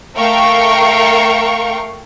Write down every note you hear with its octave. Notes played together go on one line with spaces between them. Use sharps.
A3 A#4 F5 G5 C#6